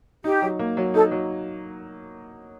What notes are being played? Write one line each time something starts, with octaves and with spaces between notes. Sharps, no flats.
D#4 G4
F#3
A#3
F#3
D#4 A4
F#3